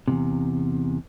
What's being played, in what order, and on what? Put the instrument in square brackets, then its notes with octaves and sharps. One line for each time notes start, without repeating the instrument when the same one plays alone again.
[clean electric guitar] E2 G2 C3